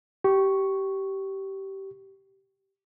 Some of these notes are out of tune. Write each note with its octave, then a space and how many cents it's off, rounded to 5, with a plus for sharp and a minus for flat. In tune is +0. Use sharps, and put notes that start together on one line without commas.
G4 -20 C#6 +0